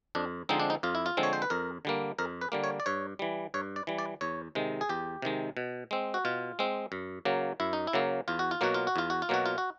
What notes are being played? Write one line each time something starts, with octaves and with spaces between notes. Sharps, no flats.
F2 D4
D3 F3 G#3 C4 D#4
D4
D#4
F2 F4
E4
F4
D3 F3 G#3 C4
C#5
C5
B4
F2 A#4
D3 G3 A#3
F2 A#4
B4
D3 G3 A#3
C#5
D5
G2 C#5
E3 G3
G2 C#5
D5
E3 G3
D5
E2 C#5
C3 D#3 G#3
G#4
E2 G4
C3 D#3 G#3
B2
G#3 C4
F#4
B2 F4
G#3 C4
F#2
C#3 F#3 A#3
F#2 E4
D#4
E4
C#3 F#3 A#3
E2 F4
F#4
F4
B2 F#3 A#3 F#4
F4
F#4
E2 F4
F#4
F4
B2 F#3 A#3 F#4
F4
F#4